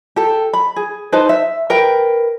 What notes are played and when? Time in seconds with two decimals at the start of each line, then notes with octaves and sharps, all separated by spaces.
0.16 G4 A4
0.53 B5
0.76 G#4
1.12 D#4 B4 C5 A5
1.29 E5
1.70 A#4 B4 G5